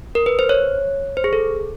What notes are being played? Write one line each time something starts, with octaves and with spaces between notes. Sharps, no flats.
A#4
B4
C5
C#5
C5
G#4
A4